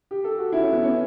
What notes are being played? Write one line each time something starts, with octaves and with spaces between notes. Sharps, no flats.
G4
A4
F#4
E4
C#4
B3
C#4